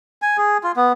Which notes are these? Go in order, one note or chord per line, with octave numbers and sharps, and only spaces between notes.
G#5
G#4
F4
B3